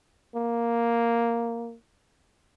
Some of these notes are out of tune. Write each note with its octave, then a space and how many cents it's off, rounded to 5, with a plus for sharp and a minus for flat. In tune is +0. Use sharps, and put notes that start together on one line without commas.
A#3 +0